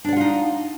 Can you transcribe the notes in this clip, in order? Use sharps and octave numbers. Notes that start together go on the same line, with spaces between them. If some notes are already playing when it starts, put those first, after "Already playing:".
D4 D#4 F4 D5 F#5